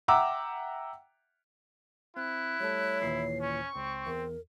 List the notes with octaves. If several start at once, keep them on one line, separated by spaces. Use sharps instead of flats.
E5 F#5 G5 A#5 D6 E6
C4 E4 F#6
G3 A3 A4 C#5
D#2 A#2 E3 C7
C#4 C#6
C#2 C4
E2 A#4